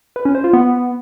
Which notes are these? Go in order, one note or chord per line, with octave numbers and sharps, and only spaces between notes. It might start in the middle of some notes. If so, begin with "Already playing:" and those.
B4
C#4
C5
F4
B3